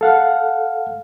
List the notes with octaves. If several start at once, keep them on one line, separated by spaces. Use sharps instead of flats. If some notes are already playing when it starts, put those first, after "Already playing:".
A4 F5 F#5